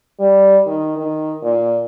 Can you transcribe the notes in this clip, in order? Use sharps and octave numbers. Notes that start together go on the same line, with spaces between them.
G3
D#3
D#3
A#2